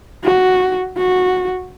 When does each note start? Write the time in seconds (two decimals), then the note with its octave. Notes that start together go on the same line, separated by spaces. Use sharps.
0.24 F#4
0.97 F#4